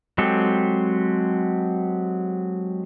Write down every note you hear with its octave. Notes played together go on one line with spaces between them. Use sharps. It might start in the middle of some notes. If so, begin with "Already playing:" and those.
F#3 G#3 C4 G4 A4